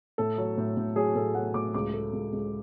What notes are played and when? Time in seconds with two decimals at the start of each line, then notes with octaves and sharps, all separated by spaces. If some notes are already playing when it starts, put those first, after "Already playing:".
0.18 A2 A4
0.38 F#3
0.58 A2
0.77 A2
0.96 F#3 G#4
1.15 A2 A4
1.35 F#3 F#5
1.54 A2 D6
1.74 C#2 D6
1.94 A3
2.13 C#2
2.33 C#2